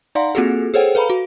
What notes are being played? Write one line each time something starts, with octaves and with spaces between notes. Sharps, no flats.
D#4 D5 F5 F#5 A#5 C6
A#3 C4 F4 F#4 G#4 A4
G#4 A4 C5 C#5 F#5 G5
A4 B4 F5 A#5 B5
F#4